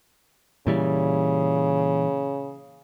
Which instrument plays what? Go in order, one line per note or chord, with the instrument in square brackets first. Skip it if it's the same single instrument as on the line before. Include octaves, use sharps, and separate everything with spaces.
[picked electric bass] A#2 E3 G3 [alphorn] C#3